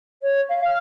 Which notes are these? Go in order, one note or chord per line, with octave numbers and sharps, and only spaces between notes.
C#5
F5
F6